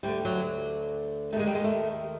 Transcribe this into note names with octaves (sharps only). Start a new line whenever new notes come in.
D2 D3 G3
F#3
D#2 D#3 G#3 A3
G3
G#3
A3